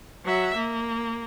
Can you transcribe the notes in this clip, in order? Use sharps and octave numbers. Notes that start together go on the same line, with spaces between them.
F#3 E5
A#3